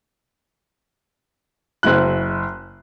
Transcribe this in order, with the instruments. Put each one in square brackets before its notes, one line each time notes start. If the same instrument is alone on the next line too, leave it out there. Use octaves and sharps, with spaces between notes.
[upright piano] F#1 F#3 E4 F#6